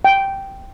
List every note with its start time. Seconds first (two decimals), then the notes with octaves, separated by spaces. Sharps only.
0.05 G5